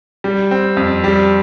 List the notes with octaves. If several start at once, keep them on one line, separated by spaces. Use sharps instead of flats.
G3
C4
F2
G3